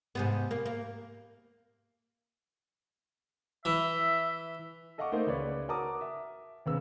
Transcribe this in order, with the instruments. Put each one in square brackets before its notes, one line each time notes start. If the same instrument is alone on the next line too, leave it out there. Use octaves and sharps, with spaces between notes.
[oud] G#2 C3 B3
A#3
A#3
[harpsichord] E3 [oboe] E5
[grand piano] A4 D#5 F5 F#5 C#6 D6
A3 A#3 D#4 A#4 C5 D#5
C#2 B4 C#5 D5 D6
F#4 A#4 A5 A#5 D6 D#6
E5
F1 C#3 B3 E6